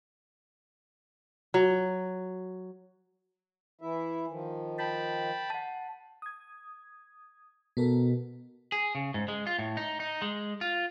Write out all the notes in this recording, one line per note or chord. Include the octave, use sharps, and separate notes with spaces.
F#3
E3 E4 E5
D#3 F3
G5 A5 B5
F#5 A5
D#6 G#6
B2 B3 A4 A#4
G#4
C#3
G#2
G#3
F4
A2
D#4
D#4
G#3
F4